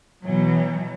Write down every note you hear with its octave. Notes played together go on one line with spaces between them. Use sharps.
B2 E3 F#3